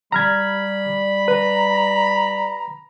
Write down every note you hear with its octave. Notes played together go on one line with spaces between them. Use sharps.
G3 D5 A#5 B5 F6 G#6
B4 A#5